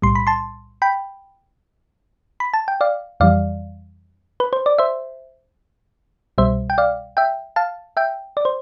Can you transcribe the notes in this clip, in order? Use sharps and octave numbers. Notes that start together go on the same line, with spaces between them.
B1 A2 G3 C6
B5
A5 C6
G5 B5
B5
A5
G5
D5 F5
F2 E3 G3 D5 F5
B4
C5
D5
C5 E5
C2 B2 G3 C5 E5
G5
D5 F5
E5 G5
F5 A5
E5 G5
D5
C5